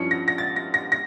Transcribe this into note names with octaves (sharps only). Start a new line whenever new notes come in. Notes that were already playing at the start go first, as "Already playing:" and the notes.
Already playing: G2 F3 C#4 E4 C#7
A#6
A#6
A6
A#6
A#6
A#6